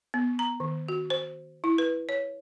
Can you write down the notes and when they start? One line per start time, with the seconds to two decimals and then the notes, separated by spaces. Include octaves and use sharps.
0.14 B3
0.39 A#5
0.60 D#3
0.89 F#4
1.10 C5
1.64 E4
1.78 B4
2.09 C#5